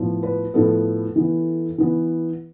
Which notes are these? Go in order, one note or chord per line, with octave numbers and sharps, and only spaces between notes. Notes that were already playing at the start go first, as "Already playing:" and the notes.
Already playing: A2 F3 B3
B4
A2 F3 B3 A4
E3 B3
E3 B3